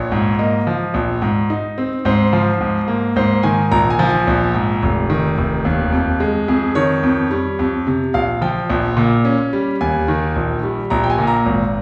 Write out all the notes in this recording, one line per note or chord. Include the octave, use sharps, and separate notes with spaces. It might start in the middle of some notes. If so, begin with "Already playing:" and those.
Already playing: A#1 C#5
G#2
A#3 D#5
F3
A#1
G#2
D#4
C4
G#2 C5
F3
G#2
A#3
G#2 C5
D#3 G#5
A#1 A#5
G#5
F3
G#5
A#1
G#2
F1
D#3
F1
D#2
F2
G#3
F2 G#4
D#3 C#5
F2
G3
F2
C3
A#1 F5
F3 G5
A#1
A#2
C#4
G3
D#2 G#5
D#3
A#1
G3
A#1 A#5
G5
G#5
A#2
A#5
G#1